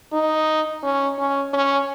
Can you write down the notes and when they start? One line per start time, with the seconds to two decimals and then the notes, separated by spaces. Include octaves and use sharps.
0.13 D#4
0.83 C#4
1.18 C#4
1.53 C#4